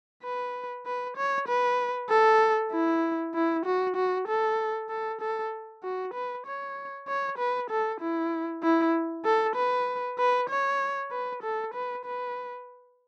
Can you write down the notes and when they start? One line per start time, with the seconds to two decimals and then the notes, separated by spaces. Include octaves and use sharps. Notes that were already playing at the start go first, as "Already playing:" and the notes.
0.23 B4
0.86 B4
1.17 C#5
1.48 B4
2.09 A4
2.72 E4
3.35 E4
3.65 F#4
3.96 F#4
4.28 A4
4.90 A4
5.21 A4
5.83 F#4
6.14 B4
6.46 C#5
7.08 C#5
7.38 B4
7.70 A4
8.00 E4
8.63 E4
9.25 A4
9.56 B4
10.19 B4
10.49 C#5
11.11 B4
11.43 A4
11.74 B4
12.05 B4